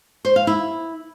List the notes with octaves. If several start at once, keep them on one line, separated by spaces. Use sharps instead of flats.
C5
F5
E4